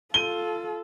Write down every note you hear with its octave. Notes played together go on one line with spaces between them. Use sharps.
F4 A4 D#7 G7